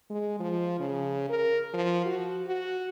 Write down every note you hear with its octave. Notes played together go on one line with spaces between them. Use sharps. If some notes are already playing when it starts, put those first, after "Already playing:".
G#3
F3
C#3
A#4
F3
F#4
F#4